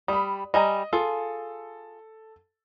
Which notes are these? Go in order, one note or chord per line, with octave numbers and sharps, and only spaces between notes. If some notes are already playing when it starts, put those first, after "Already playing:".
G3 B5 D#6
G3 D#5 G#5 A#5
F4 G#4 A4